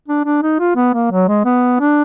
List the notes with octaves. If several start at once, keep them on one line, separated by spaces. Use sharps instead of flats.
D4
D4
D#4
F4
B3
A#3
F#3
G#3
B3
D4